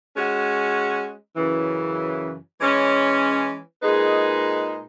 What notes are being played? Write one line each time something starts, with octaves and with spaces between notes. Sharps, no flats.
G#3 C#4 F#4
F#2 C#3 E3
E3 G#3 C#4
A#2 G#3 D#4 G#4 B4